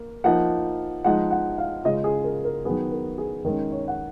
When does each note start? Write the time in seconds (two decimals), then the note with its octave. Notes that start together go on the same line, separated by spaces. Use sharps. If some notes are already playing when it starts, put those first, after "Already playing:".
Already playing: A#3
0.24 F3 A#3 D#4 F#5
1.04 F3 G#3 D#4 F#5
1.31 F#5
1.58 F5
1.84 C#3 G#3 C#4 F4 D#5
2.04 G#4
2.24 A#4
2.45 A#4
2.65 D#3 F#3 B3 G#4
2.92 A#4
3.18 G#4
3.45 D#3 G#3 C#4 A#4
3.71 C#5
3.88 F#5